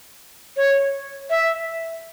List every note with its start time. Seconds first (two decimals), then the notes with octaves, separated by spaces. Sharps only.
0.57 C#5
1.30 E5